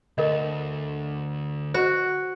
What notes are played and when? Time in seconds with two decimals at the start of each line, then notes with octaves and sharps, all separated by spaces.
0.18 D2 A#4 D#5
1.74 F#4 C5